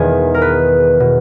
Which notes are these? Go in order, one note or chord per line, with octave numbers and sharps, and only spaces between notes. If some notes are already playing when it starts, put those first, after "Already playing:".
Already playing: E1 E2 D#3 G#4
A#4
B4
B2